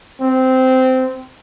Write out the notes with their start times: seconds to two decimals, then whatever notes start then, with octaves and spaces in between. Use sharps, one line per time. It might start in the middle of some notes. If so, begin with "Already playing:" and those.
0.21 C4